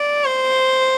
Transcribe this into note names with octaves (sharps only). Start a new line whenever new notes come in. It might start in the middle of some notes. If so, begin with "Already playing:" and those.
Already playing: D5
C5